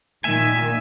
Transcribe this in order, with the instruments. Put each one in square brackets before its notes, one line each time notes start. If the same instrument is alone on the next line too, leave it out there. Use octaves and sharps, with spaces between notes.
[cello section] A#2 D#3 [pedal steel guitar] E5 G#5